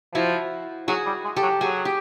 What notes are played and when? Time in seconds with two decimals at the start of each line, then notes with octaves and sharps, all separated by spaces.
0.15 F3 E4 F#4
0.88 F#3 F#4 G#4
1.06 G3
1.24 G#3
1.36 G4 A4
1.42 F#3
1.61 F#3 F#4 G#4
1.85 G4